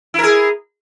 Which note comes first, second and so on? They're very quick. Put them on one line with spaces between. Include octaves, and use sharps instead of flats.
E4 A#4 G#4